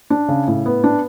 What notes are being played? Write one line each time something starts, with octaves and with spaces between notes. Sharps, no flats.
D4
C#3
A2
B3
D4